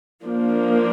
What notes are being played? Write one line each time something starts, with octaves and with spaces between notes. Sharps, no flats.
F3 A#3 D4